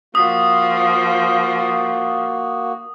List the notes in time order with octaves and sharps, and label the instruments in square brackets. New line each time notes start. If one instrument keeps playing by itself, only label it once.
[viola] F3 [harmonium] A#3 F#4 [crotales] D#6